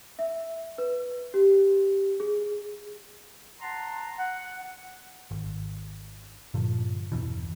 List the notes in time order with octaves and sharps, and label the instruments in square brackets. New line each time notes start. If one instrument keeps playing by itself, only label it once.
[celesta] E5
B4
G4
G#4
[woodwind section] F#5 A5 A#5 C6
F#5
[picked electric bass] G#1
G2 A#2 D3 F3
G1 E2 B2 E3